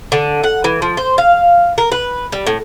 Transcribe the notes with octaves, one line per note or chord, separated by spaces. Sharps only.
D3
F#5
E3
F3
C5
F5
A#4
B4
G3
A2